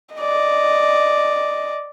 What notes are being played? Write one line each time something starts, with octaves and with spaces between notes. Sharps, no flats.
D5 D#5